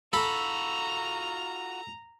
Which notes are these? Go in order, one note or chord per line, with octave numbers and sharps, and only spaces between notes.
F4 F#4 A4 A#5 B5